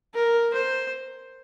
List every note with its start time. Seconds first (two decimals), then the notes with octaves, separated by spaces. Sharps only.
0.14 A#4
0.54 C5